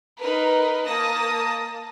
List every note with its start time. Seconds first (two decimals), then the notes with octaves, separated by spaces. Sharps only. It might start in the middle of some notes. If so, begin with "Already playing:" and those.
0.20 D#4 A#4 B4
0.86 A#3 A5 D#6 A#6